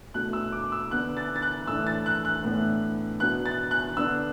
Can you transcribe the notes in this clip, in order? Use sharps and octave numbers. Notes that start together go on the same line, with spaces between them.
B2 A3 D4 F#6
E6
D6
E6
D3 B3 D4 F#6
A6
A6
F#6
A2 E3 A3 D4 E6
A6
F#6
F#6
A2 E3 B3 D4
B2 B3 D4 F#6
A6
F#6
D3 B3 D4 E6